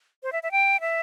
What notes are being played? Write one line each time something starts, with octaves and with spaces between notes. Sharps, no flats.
C5
E5
E5
G5
E5